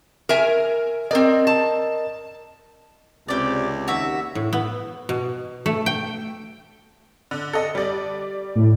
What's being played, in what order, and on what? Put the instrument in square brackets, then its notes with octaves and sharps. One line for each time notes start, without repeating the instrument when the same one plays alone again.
[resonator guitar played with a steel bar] A#4 E5 G#5
[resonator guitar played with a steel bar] C4 D5 [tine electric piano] A#4 D#5
[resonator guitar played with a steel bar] A5
[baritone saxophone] C#2 [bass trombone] C3 [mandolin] G4 D5
[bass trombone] D#2 [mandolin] F#4 E5
[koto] A2
B3
B2
A3
G5
[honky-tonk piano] D3
A4 D#5
G3 D5
[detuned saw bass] A2